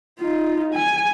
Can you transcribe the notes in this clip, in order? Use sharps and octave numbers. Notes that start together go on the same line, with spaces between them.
D#4 F4
G#5